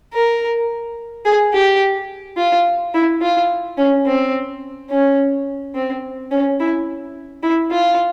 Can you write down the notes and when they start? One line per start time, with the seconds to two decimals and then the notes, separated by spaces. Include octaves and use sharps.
0.13 A#4
1.25 G#4
1.53 G4
2.37 F4
2.94 E4
3.22 F4
3.77 C#4
4.06 C4
4.90 C#4
5.75 C4
6.31 C#4
6.60 E4
7.43 E4
7.71 F4